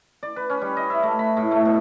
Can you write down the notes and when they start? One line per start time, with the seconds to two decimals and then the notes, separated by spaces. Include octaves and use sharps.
0.23 D5
0.36 B4
0.50 C#4
0.62 G3
0.77 D#5
0.90 E5
1.03 A3
1.19 B5
1.37 A2
1.51 A3
1.65 B2